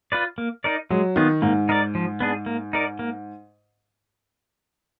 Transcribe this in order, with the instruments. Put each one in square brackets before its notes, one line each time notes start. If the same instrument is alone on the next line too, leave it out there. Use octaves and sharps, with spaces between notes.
[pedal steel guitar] F4 B4 D5
A#3
D#4 A#4 D5
[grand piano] F#3 [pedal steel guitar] G#3
[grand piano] D#3 [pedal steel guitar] B3 F4
[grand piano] G#2 [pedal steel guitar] A#3
[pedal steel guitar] D#4 A#4 D5
F3
B3 D4 G#4
A#3
D#4 A#4 D5
A#3